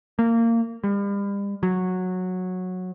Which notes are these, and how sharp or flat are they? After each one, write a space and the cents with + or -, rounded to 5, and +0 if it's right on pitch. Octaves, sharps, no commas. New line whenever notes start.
A#3 -20
G3 +40
F#3 -10